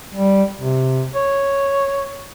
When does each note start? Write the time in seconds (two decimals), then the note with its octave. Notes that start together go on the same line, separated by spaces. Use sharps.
0.15 G3
0.60 C3
1.14 C#5